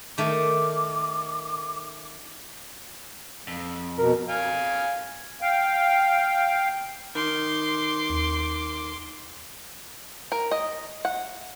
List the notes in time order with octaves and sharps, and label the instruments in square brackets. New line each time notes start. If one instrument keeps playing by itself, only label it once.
[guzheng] D#3 A3 [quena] D6
[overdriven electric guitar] F2
[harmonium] B2 [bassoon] A#4
[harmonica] F5 G#5
[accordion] F5 G5
[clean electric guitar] D#3 [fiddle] C6 D6
[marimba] D#2
[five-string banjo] A#4
D#5
F#5